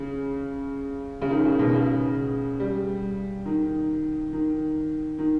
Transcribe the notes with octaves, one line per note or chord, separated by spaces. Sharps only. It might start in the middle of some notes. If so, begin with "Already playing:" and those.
Already playing: C#3
C#3
D#3
C#3
B2
C#3
G3
D#3
D#3
D#3